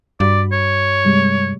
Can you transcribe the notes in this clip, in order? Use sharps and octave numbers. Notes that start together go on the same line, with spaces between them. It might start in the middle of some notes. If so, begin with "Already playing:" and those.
G2 F#4 D5 B5
C#5
C3 G3 G#3